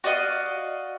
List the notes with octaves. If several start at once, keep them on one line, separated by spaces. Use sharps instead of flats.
F#4 D5 D#5 F5